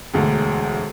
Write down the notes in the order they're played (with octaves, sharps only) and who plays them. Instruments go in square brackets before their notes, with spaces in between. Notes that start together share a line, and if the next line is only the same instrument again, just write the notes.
[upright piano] E1 D2